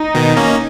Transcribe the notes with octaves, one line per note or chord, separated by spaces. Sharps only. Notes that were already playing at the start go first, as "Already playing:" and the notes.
Already playing: D#4
B2 D#3
A#3 C#4